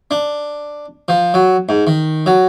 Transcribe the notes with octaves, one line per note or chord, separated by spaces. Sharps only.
D4
F3
F#3
G#2
D#3
F#3